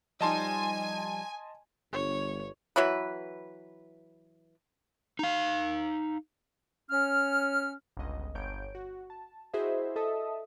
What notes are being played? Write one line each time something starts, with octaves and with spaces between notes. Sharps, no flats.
F3 G3 D#4 D#5 G#5 A5 C6
G1 C#5
E3 F#3 E4 B4
D#4 F5
C#4 F6
G1 C#2 D#5
G1 C#5 G6 D7
F#4
A5
E4 F#4 G#4 C5 D#5 E5
A4 D#5 E5 A5 D#6